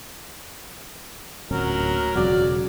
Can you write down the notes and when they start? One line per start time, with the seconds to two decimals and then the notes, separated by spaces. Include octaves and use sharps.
1.51 D1 A#2 F#3 C#4 A#4
2.16 E1 F2 C#3 F#3 D5